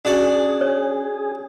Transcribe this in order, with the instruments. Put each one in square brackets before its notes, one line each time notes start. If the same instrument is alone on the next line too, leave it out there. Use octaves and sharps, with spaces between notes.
[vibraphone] C#4 [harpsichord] D4 F#4 D5 [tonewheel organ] G#4
[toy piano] C#5